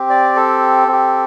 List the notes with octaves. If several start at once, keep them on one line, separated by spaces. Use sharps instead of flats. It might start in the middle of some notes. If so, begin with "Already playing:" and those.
Already playing: C4 G4
D5
A4
C4 G4